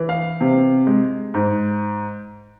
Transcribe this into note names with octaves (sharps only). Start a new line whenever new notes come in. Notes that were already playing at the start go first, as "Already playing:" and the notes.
Already playing: E3
F5
C3
G#3
G#2